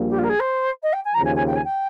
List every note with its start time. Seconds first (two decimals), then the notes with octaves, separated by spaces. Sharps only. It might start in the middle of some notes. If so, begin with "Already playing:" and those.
Already playing: A#1 A#2 G3 A#3
0.09 G4
0.18 F4
0.23 A#4
0.29 G#4
0.39 C5
0.82 D#5
0.93 G5
1.04 G#5
1.14 D#2 C#3 F3 A#5
1.24 G#5
1.35 G#5
1.46 G5
1.55 G#5
1.64 G5